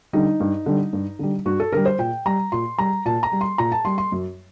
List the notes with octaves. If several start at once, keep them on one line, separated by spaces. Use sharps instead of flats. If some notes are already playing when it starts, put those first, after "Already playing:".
D3 G3 D#4
G2
D3 G3
G2
D3 G3
G2 F#4
A4
D3 G3 A#4
C5
A#2 G5
G3 A#5
A#2 C6
G3 A#5
A#2 A5
A#5
G3
C6
A#2 A#5
A5
G3 C6
C6
F#2